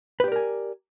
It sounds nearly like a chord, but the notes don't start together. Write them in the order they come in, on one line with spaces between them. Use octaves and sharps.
B4 G4 D5 A#4 G#5